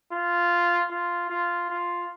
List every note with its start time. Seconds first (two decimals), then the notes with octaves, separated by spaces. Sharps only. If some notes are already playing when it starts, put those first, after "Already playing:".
0.12 F4
0.91 F4
1.30 F4
1.70 F4